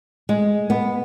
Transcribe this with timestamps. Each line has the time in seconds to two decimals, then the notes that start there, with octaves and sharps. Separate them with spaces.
0.29 G#3
0.70 B3